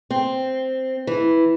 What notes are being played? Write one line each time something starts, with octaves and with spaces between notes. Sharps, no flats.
C4
E3